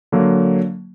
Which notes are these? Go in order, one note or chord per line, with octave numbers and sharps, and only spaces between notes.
D3 F#3 A#3